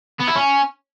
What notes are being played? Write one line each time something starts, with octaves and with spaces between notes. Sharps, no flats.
B3
E4
C#4